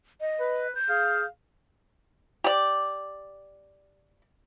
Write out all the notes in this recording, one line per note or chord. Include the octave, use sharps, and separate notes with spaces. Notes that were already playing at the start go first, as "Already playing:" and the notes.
D#5
B4
G6
G#4 F5
G4 D5